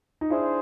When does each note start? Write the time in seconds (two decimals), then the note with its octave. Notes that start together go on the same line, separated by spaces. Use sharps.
0.21 D#4
0.30 D4 E4 G#4 C5